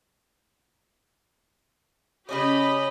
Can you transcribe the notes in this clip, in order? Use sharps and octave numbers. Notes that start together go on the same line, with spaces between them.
C#3 C#4 G4 C#5 D#5 B5